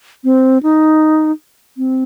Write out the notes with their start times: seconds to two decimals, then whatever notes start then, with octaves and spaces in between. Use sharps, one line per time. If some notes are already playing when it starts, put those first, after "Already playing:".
0.24 C4
0.63 D#4
1.77 C4